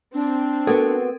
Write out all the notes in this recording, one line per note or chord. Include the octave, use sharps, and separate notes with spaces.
C4 D4
B3 F#4 A4 A#4